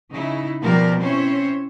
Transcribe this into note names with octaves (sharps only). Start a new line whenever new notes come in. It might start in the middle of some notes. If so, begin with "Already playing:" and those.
C#3 D#4 E4
B2 F3 G3 G4 A#4 D5
C4 C#4 E4 C5 C#5